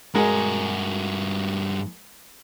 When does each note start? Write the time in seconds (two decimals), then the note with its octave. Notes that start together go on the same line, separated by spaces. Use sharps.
0.15 G2 G#3 F#4 A#4